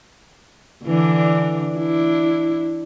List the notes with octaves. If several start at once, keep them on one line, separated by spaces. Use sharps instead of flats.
D3 E3 D4
D4 E4